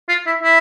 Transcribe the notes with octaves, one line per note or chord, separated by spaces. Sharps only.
F4
E4
E4